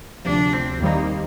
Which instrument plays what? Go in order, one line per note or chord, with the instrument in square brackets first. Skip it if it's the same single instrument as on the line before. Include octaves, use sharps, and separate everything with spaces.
[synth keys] D2 C3 F3 [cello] D4
[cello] C4
[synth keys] D#2 D#3 G3 C4 D#4 [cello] A#3